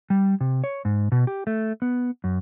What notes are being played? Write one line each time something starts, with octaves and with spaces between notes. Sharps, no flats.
G3
C3
C#5
G#2
B2
G4
A3
B3
F#2